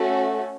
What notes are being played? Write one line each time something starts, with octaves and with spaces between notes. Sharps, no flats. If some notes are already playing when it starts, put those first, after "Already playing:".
Already playing: A3 C#4 F#4